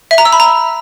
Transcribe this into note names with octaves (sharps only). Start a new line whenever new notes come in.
E5
A#5
E6
B5
A#5